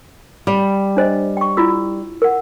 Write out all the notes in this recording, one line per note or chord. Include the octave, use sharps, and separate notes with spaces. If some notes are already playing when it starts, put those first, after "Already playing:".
G3
D4 C5 D#5
G5 C#6
E4 F4 E6
A#4 F#5